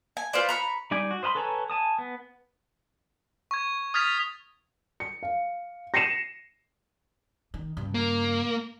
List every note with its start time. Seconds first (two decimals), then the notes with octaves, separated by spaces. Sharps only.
0.17 G#5
0.33 F4 B4 C5 D5
0.49 A#5 B5 C#6
0.91 G3 D#4 D5 G#5
1.11 F#4
1.23 C5 D#5 F5 B5 C6
1.35 A4 B4 C#5 G#5 A#5
1.70 G#5 A5 D#6
1.98 B3
3.51 C#6 G#6
3.94 D#6 F6 G#6 A6 B6 F7
5.00 C#7
5.23 F5
5.94 A#6 C7 C#7 D#7 E7
7.54 D#3
7.77 G2 C#3
7.94 A#3